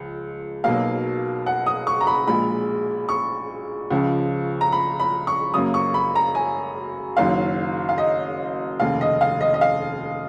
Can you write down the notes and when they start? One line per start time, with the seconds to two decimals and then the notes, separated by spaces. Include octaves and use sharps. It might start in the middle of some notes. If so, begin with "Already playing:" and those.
Already playing: C#2 F3 G#3
0.64 B1 B2 F#3 A#3 F5
1.46 F#5
1.66 D#6
1.87 C#6
2.01 A#5
2.07 B5
2.27 A#1 A#2 G#3 B5
3.09 C#6
3.91 C#2 C#3 F3
4.61 A#5
4.72 B5
5.00 B5
5.27 C#6
5.54 F#2 C#3 F#3 A#3 D#6
5.74 C#6
5.94 B5
6.15 A#5
6.35 G#5
7.17 F#1 F#2 D#3 F#3 F5
7.89 F5
7.98 D#5
8.80 F1 D#2 C#3 F5
9.01 D#5
9.21 F5
9.41 D#5
9.54 D#5
9.61 F5